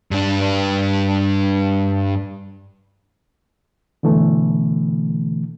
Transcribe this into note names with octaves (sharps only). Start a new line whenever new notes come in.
G2 D4
B2 D3 E3 A3